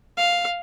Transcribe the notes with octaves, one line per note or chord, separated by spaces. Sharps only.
F5